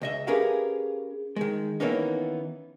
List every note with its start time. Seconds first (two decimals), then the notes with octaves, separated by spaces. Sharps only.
0.01 C#2 D#5 E5
0.27 C#4 G4 G#4 A#4 B4 F5
1.36 D#3 G#3
1.80 D#3 E3 A#3 B3 C#4 D#4